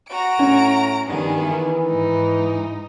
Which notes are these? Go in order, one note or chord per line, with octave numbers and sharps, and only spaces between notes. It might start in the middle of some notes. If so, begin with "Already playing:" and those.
F#4 A#5 D7
A2 C#4
G2 D#3 B3 G#4
E3
G#2 D#4